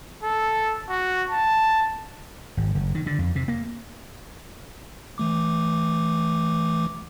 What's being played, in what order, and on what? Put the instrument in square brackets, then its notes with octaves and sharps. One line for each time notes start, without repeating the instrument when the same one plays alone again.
[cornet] A4
F#4
A5
[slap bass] G#1
F#1
D#3
D3
F2
C3
A#3
[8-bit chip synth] E3 A3 D6